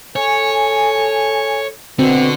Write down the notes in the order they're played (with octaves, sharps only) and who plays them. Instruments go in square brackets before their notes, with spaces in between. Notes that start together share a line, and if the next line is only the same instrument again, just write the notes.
[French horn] A4 [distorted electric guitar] C#5 [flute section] G#5
[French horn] B2 [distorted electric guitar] D3 [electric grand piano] C4 [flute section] F#4